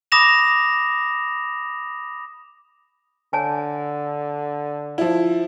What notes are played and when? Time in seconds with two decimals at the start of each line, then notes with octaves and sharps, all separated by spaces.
0.12 B5 D6 D#6 A#6 E7 F7
3.33 D3 C#5 G#5 A5
4.98 F3 E4